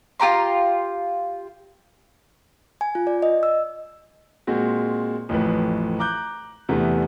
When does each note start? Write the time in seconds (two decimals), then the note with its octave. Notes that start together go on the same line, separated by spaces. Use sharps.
0.20 F4 G4 A#5 C6
2.81 G#5
2.95 F4
3.07 D5
3.22 D#5
3.43 E6
4.47 A#2 G#3 C4 F#4
5.29 A1 F2 A2 B4
5.99 A#5 D6 F#6 G6
6.69 E2 C3 A3 B3 D4